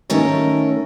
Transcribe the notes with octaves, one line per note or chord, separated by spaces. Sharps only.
D#3 A3 C#4 A#4 C#5